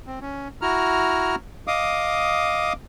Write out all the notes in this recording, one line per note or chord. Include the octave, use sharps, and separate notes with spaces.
C4
C#4
E4 F#4 A#5 F6
D#5 F5 D6 D#6